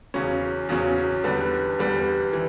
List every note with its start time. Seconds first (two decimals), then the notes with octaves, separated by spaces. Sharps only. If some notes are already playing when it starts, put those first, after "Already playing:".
0.14 E2 C#3 F#3 C#4
0.69 E2 C#3 F#3 C#4
1.24 E2 D3 G3 B3
1.79 E2 D3 G3 B3
2.33 E3